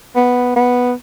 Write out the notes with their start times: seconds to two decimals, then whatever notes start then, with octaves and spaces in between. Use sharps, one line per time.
0.16 B3
0.56 B3